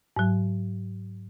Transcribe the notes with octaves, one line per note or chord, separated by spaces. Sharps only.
G#2 F#3